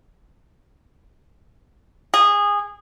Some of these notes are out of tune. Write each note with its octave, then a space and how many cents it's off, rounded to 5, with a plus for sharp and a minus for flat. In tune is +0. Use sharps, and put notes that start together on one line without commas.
G#4 -20